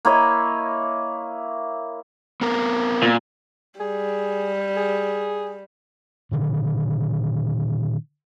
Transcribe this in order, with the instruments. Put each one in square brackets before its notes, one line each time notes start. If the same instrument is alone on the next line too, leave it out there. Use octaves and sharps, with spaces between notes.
[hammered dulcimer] A#3 E4 C#5 D#5
[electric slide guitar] B3 C4 A#4
[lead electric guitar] A#2
[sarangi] G3 [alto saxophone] G#4
[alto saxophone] G#4
[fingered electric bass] A#2 D3 D#3